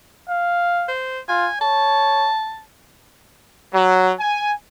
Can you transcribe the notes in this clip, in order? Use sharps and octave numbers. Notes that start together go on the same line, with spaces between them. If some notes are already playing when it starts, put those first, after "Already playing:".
F5
C5
F4 G#5
C#5 A5
F#3
G#5